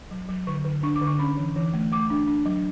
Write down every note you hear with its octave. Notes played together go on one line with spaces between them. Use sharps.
F#3
F#3
D3 C#6
D3
D4 C#6
D6
D3
C#6
C#4 B5
E3
E3
A3
A3 D6
D4
D4
F#3